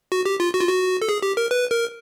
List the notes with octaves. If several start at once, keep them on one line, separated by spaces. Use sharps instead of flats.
F#4
G4
F4
F#4
F4
F#4
A4
G#4
G4
A#4
B4
A#4